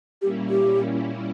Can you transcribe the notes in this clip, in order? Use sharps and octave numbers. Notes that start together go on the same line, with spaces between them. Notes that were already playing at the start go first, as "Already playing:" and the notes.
A#2 G3 A#3 C#4 E4 G4
G4